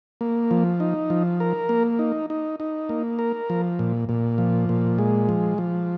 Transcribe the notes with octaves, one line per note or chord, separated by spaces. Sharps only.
A#3
F3
D#4
F3
A#4
A#3
D#4
D#4
D#4
A#3
A#4
F3
A#2
A#2
F3
A#2
G#3
F3
F3